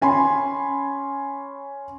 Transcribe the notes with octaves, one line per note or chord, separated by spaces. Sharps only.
C#4 G#5 B5 C6